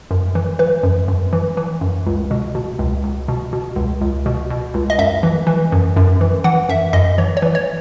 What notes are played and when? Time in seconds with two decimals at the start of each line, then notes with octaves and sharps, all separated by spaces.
0.11 F#2
0.35 E3
0.59 E3 B4
0.83 F#2
1.08 F#2
1.33 E3
1.57 E3
1.81 F#2
2.06 C#2
2.31 B2
2.55 B2
2.79 C#2
3.04 C#2
3.28 B2
3.53 B2
3.76 C#2
4.01 C#2
4.26 B2
4.50 B2
4.74 C#2
4.90 D#5
4.99 F#2 E5
5.23 E3
5.47 E3
5.72 F#2
5.96 F#2
6.21 E3
6.44 E3 F#5
6.69 F#2 E5
6.93 F#2 D#5
7.18 E3 C#5
7.37 C#5
7.42 E3
7.55 C#5